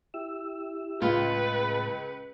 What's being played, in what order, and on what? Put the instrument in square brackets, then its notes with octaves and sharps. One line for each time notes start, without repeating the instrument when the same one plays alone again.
[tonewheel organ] E4 G4 E6
[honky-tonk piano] C#2 [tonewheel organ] A2 G#3 A5 [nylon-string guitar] F4 [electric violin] B4